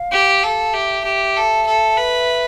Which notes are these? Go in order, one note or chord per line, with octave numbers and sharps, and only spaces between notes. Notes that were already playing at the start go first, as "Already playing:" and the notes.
Already playing: F5
G4
A4
G4 E5
G4
A4
A4
B4